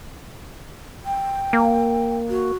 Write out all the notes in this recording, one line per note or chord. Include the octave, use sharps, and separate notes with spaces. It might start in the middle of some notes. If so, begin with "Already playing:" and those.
G5
A#3
F#4